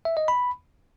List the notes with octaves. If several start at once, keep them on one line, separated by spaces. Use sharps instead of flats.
E5
D#5
B5